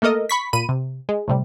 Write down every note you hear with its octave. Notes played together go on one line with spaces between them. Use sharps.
A3 A#3 A4 A#4 D#5
B5 C#6 B6
A#2 B5 D#7
C3
G#3
A2 C3 G3